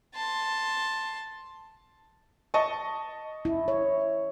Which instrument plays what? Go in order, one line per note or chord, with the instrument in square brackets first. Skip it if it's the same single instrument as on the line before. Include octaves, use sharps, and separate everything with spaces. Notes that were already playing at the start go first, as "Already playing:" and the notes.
[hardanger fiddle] A5 C6
[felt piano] D#5 A5 C#6
[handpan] E4
C#5